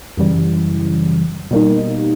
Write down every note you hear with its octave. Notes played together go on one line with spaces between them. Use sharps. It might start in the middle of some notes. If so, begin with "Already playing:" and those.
F#2 C#3 E3 G3
B2 G3 A#3 D#4